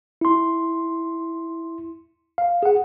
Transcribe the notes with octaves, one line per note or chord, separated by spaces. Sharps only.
E4 C6
F5
G#4 F#5